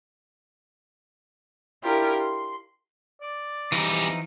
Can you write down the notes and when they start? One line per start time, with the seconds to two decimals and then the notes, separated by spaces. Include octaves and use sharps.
1.82 D4 E4 F4 G4 A#4
2.18 C6
3.21 D5
3.72 E2 E3 F3 G3 D#4 A#5